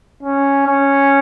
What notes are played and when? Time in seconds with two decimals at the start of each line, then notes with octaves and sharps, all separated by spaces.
0.23 C#4
0.67 C#4